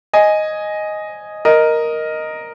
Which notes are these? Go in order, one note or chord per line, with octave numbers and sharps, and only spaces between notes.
D#5 G#5
A#4 D#5